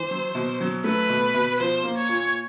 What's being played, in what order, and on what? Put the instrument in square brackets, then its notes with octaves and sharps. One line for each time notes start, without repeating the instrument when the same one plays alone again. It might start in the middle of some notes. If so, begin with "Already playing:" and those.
Already playing: [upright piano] E3 [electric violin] C5
[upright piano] F#3
B2
F#3
[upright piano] A3 [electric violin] B4
[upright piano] B2
B2
[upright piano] F3 [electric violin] C5
[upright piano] A#3
[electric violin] C#5
[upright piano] A#2